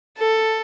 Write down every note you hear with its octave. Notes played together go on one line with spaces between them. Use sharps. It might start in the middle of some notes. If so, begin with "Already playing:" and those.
A4